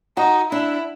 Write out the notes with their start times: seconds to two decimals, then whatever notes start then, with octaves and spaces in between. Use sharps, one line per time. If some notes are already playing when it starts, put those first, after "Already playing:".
0.17 D#4 F#4
0.51 D4 E4